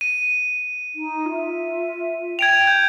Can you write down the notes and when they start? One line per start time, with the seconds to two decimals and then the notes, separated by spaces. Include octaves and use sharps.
0.01 D#7
0.95 D#4
1.28 F4 E5
2.39 G5 G#6 D7 F7
2.67 G6